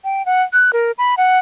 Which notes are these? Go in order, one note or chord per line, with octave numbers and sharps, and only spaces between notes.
G5
F#5
F#6
A#4
B5
F#5